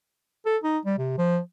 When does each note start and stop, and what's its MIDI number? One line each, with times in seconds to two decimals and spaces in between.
0.46 0.57 69
0.63 0.78 63
0.85 0.96 55
0.98 1.16 48
1.18 1.39 53